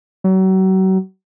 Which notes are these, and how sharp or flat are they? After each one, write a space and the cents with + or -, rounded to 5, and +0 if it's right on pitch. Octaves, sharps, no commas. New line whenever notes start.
F#3 +35